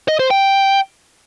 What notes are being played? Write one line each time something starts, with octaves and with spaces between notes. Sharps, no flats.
D#5
C5
G5